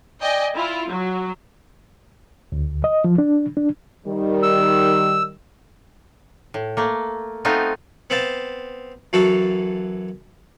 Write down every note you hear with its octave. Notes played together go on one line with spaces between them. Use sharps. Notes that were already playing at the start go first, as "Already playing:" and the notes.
D5 D#5 G5 G#5
E4 F4
F#3
D2
D#5
F3
D4
D4
D#3 G3
E6
A2
A3 A#3
A3 B3 C4 D#4 F4
B3 C4 F5 A5
F#2 E3 F#4 A4 F5